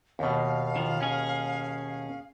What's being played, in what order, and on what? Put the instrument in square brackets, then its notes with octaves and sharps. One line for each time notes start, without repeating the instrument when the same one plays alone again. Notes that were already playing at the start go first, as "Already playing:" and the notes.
[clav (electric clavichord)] D#2 B2 [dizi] F5
[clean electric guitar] D#3 F3
C#4 G#4